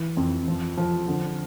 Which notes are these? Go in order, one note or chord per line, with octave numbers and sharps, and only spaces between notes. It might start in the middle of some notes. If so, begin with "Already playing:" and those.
Already playing: E3
F2
F3
F3
D3